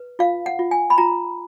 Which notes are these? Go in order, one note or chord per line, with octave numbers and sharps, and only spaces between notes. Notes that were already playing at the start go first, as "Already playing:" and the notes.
Already playing: B4
F4 F5
F#5
F4
G#5
B5
F4 A#5